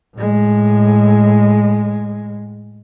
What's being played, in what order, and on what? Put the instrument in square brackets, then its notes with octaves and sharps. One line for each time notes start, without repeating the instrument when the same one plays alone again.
[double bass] A2 G#3